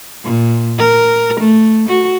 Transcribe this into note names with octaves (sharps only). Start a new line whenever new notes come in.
A#2
A#4
A3
F#4